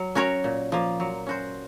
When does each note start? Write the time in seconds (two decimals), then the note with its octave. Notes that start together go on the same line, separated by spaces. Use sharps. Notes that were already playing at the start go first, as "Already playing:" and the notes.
Already playing: F#3
0.15 C#4 F#4 A#4 C#5
0.44 A#2
0.72 F3 A#3
1.00 F#3
1.27 C#4 F#4 C5